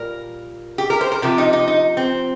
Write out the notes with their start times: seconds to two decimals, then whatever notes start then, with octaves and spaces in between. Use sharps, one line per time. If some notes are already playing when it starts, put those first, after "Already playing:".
Already playing: A#2 G3 A#4
0.78 G4
0.90 A#4
1.01 C5
1.12 A#4
1.22 C3 F3 G4
1.38 D#4
1.53 D#4
1.68 D#4
1.97 C4